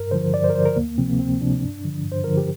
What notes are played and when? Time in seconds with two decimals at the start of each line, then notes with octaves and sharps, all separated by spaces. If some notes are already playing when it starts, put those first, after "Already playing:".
Already playing: G2 A#4
0.11 D3 F3 C5
0.33 G2 D5
0.44 C5
0.50 A#4
0.55 D3 F3 C5
0.66 A#4
0.76 D2 A#3
0.98 C3 F3 C4
1.09 A#3
1.19 D2 C4
1.41 C3 F3 D4
1.63 G2
1.85 D3 F3
2.05 G2
2.12 C5
2.24 D3 F3 A#4
2.37 G4